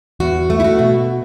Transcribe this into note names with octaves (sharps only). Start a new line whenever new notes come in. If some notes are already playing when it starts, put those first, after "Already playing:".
E2 F#4
A3
E4
F#4
B2